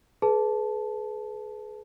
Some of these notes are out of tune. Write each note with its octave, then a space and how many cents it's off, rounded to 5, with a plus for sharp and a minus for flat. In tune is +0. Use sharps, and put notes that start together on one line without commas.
G#4 +35 B4 +0 A5 -5